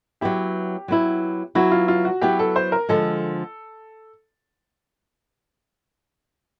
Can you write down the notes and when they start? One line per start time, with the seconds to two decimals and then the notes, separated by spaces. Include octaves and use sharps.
0.21 F#3 B3 E4 G4
0.88 F#3 B3 E4
1.55 F#3 B3 E4 F#4
1.72 F4
1.88 F4
2.05 F#4
2.21 F#3 B3 E4 G4
2.39 A4
2.56 C5
2.72 A#4
2.89 D3 F3 G#3 A4